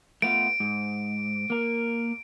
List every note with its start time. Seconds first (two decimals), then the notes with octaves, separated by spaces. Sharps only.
0.22 A3 B3 F4 D7
0.60 G#2
1.50 A#3 A#4